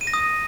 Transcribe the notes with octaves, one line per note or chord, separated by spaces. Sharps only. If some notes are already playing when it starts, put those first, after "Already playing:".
D#7
A#6
D#6